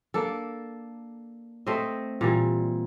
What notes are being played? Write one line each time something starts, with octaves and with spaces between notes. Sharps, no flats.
A#3 D4 A4
A3 C4 C5 D#5
A#2 E3 G3